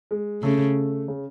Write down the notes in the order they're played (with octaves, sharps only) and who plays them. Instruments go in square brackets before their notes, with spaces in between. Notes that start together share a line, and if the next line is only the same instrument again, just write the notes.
[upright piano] G#3
[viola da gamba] C#3 [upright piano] A3
[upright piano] C#3